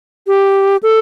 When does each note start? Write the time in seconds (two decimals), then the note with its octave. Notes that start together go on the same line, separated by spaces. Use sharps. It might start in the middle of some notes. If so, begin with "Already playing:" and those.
0.27 G4
0.83 A4